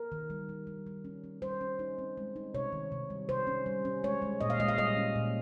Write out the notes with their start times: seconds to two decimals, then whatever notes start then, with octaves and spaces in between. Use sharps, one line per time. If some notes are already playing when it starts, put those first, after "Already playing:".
Already playing: A#4
0.12 D#3
0.30 G3
0.49 G3
0.67 G3
0.87 G3
1.05 C#4
1.24 C#4
1.42 G3 C5
1.61 C#4
1.79 D#4
1.99 C4
2.17 G#3
2.36 D#4
2.54 C3 C#5
2.72 D#3
2.92 C3
3.10 G3
3.29 C3 C5
3.47 C#4
3.66 G3
3.85 C#4
4.04 G#3 C#5
4.22 G#3
4.41 A#2 D#5
4.50 F5
4.60 G#3 D#5
4.69 F5
4.78 G3 D#5
4.97 C#4
5.16 A#2